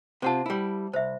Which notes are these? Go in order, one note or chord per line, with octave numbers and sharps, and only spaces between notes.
C3 C4 F4 C5 F#5 A5
G3 E4
C2 C5 E5